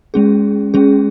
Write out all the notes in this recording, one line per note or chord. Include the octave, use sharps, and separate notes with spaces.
G#3 C#4 G#4
G#3 C#4 G#4